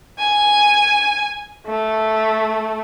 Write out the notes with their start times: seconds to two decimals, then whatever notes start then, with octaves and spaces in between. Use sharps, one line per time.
0.19 G#5
1.66 A3